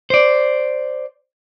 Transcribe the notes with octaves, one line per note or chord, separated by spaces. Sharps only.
C5 D5